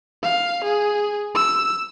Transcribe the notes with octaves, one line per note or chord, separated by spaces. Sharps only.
F5
G#4
E6